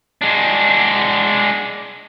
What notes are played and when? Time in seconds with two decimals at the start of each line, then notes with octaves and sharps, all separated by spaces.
0.22 G#3 D4